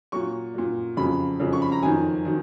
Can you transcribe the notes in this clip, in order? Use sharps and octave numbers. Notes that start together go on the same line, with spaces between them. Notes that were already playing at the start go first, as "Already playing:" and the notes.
A#2 F#3 C#6
A#2 F#3
F2 C#3 F#3 B5
F2 C#3 F#3
C#6
B5
A#5
F2 D#3 F#3 G#5
D#3 F#3